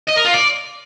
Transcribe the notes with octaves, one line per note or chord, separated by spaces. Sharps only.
D#5
A#4
F4
D5